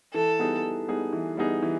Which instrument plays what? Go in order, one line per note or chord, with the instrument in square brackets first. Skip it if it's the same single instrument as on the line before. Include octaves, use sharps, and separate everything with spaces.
[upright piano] E3 [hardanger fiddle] A4
[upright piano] G3 B3 D#4 G#4
E3
G3 B3 D#4 G#4
E3
G3 B3 D#4 G#4
E3